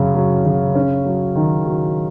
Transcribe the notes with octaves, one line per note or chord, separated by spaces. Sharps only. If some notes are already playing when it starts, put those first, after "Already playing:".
Already playing: F#2 C#3 F#3
F#3
C#3
C#4
F#3
D#3
F#3